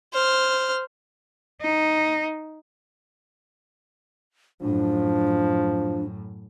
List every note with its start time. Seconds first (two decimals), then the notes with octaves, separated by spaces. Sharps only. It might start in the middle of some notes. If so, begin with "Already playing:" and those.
0.13 C5 F6
1.61 D#4
4.61 F#2 A2 F3 D4